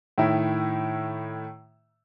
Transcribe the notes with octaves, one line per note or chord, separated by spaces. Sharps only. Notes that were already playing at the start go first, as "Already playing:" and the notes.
A2 D#3 E4